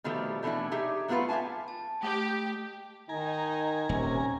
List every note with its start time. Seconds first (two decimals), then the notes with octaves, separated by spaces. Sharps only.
0.04 B2 D#3 F3 G3 A3 G4
0.43 B2 E3 A3 D4 E4
0.72 D#4 G4 G#4 E5
1.08 F#3 A3 B3 E4 F4 B4
1.29 G4 E5 F5 G#5 A5
1.68 A5
2.03 A3 G4
3.09 D#3 D#4 G#5 A#5
3.89 D#1 C3 C#4